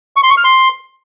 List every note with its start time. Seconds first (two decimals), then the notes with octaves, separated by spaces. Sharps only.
0.16 C#6
0.23 C6
0.30 C#6
0.37 F6
0.44 C6